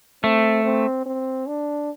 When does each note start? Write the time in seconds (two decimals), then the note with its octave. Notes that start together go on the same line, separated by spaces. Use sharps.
0.23 A3 C4
0.64 C4
1.06 C4
1.47 D4